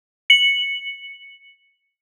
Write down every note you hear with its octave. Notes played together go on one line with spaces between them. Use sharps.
C#7 F#7